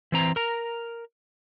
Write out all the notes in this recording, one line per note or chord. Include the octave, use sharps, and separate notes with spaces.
E3 C4 A#5
A#4 A#5